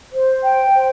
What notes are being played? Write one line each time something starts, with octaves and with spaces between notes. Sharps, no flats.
C5
G5
C5